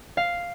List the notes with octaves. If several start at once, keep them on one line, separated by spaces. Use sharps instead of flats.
F5